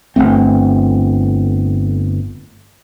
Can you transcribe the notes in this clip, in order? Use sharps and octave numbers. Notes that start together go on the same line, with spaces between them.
G1 F2 A3 C4